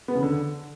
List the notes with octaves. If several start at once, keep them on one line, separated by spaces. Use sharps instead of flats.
B3
C#3
D3